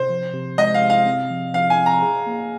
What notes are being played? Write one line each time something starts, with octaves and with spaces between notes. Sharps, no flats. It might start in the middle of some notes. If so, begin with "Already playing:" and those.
Already playing: C3 C5
F3
C3
G#3 D#5
F5
C3
F5
C4
F3
F3 F5
G#5
C4
A#5
G#4
A#3